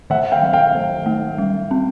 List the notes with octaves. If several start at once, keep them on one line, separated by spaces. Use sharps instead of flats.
D#3 E5 F#5
F5 G5
F#3
F5 G5
D#3
A3
G3
C4